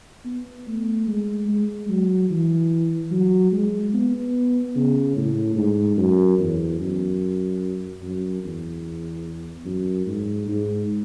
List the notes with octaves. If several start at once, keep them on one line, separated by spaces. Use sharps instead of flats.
B3
A3
G#3
G#3
F#3
E3
F#3
G#3
B3
C#3
A2
G#2
F#2
E2
F#2
F#2
E2
F#2
G#2
G#2